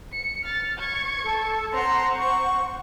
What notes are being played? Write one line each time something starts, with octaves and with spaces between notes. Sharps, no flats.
C#7
F6 A6
C#6 G#6
A4
C4 F#5 A#5 C6
C#6